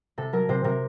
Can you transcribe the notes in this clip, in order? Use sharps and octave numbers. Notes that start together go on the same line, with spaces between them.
C3 A4
F#3 A#4
C3 C5
C3 A#4